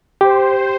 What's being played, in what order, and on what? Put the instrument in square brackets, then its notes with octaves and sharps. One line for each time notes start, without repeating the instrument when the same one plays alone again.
[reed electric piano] G4 [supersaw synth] C5